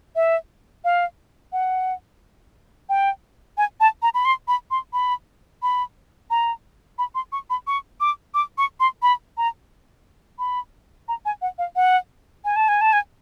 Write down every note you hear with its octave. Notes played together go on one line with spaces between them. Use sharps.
E5
F5
F#5
G5
G#5
A5
A#5
B5
C6
B5
C6
B5
B5
A#5
B5
C6
C#6
B5
C#6
D6
D6
C#6
C6
B5
A#5
B5
A#5
G#5
F#5
F5
F#5
G#5
A5
G#5
A5
G#5